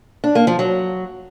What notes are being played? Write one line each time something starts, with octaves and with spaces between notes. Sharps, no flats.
D4
A#3
F3
F#3